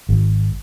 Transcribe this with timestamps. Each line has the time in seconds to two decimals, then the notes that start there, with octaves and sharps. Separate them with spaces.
0.09 G#1